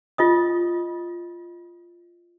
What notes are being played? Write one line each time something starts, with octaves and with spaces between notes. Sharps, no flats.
F4 D#5 D#6